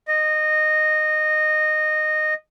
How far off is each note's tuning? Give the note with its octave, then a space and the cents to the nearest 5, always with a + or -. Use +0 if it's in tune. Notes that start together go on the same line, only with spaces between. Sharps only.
D#5 -15